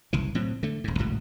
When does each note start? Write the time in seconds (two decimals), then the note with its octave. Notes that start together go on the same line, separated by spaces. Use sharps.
0.13 F#1 C2 E3
0.35 A2 F#3 C4
0.63 D3 A3
0.84 D#1 G#2
0.98 G#1 C#2 A2 F#3